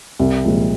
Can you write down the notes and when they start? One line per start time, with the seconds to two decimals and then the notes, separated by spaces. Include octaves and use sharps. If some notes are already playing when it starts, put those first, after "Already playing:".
0.19 C2
0.45 A#2 F3 G#3